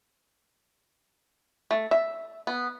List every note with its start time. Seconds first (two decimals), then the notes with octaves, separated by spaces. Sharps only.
1.71 A3
1.91 E5
2.47 B3